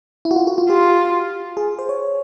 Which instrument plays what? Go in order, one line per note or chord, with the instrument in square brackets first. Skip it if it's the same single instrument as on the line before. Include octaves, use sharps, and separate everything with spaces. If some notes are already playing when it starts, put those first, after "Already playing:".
[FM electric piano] E4
F#4
F4
F#4
F4
[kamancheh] F4 [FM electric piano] G4
[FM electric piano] G#4
C5
C#5